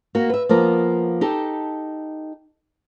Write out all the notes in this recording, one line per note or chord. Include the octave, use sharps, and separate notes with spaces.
A#3 F#4
B4 E5
F3 A#3 B3 A#4
D#4 G4 A4